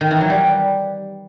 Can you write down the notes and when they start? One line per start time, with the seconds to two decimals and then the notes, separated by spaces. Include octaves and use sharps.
0.01 D#3
0.11 E3
0.21 F#3
0.30 G3